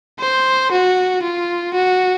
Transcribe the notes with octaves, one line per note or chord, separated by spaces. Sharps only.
C5
F#4
F4
F#4